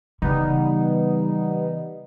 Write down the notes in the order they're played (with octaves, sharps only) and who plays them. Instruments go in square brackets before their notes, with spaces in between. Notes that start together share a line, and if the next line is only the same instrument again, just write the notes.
[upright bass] C#3 E3 [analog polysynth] G3 B3 D#4